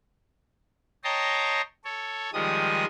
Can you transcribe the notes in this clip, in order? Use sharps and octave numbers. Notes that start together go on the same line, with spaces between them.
C#5 D#5 G5 A5 A#5 C6
A4 C#5
D#3 F3 G3 G#3 D#6